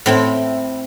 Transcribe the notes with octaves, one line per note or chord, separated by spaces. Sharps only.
A2 C4 E4